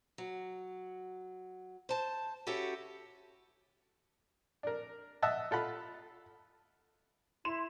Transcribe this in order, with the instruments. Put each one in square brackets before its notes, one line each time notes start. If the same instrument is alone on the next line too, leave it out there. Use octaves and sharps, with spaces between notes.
[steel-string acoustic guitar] F#3
C5 A5
C#4 E4 F#4 G4 A4
[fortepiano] D4 A#4
D#5 E5 F#5 A5
F4 A4 F#5 B5
[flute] E4 [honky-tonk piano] C6 E7